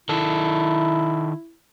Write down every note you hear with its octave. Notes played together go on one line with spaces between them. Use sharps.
D#3 E4 A4